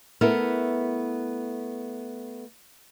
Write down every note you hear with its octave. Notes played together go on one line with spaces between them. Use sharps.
A3 B3 E4 A4 A#4